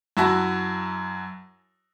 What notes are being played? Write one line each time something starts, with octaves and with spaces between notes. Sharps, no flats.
F#2 E4 F#4 A5